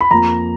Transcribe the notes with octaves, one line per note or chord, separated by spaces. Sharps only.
B5
F2 F3 A#3 A#5